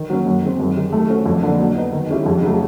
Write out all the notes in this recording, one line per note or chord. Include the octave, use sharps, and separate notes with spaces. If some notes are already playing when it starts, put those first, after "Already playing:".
Already playing: D#3
F#3 A#3 C#4
F#2
D#3 G#3 C4
F#2
D#3 G3
A3
C#4 F#4 A4 C5
F2
D3 F3 A#3 D4
F#3
B3 D#4
D#3
G#3 C#4 E4 G4
F2
C#3 F#3 A3